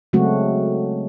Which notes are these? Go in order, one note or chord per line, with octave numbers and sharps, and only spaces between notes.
C#3 F#3 G#3 A3 C4 F#4